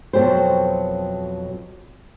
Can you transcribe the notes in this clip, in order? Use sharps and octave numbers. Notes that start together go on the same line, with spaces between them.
F2 B2 F#3 G4 A4 C5